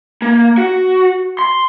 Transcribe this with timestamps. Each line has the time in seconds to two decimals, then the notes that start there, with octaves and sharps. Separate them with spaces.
0.22 A#3
0.58 F#4
1.39 C6